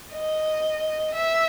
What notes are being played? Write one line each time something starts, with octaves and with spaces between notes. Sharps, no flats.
D#5
E5